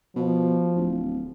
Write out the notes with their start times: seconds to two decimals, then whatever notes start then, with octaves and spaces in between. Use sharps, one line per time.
0.16 B2 F3
0.76 D1